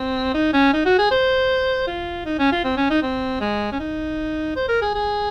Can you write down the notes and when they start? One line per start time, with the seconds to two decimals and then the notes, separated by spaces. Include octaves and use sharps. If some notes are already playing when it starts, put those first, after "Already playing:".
Already playing: C4
0.34 D#4
0.53 C#4
0.73 D#4
0.85 F#4
0.98 G#4
1.11 C5
1.87 F4
2.25 D#4
2.39 C#4
2.52 F4
2.64 C4
2.77 C#4
2.90 D#4
3.02 C4
3.40 G#3
3.72 C#4
3.79 D#4
4.56 C5
4.68 A#4
4.82 G#4
4.95 G#4